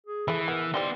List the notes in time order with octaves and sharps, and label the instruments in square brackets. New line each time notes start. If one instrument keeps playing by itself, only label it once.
[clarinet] G#4
[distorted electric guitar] E3 [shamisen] A3 E4 [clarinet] G#4
[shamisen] B3 [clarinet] A#4
[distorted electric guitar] B3 C6 [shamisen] D#4 G4 C5 [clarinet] D5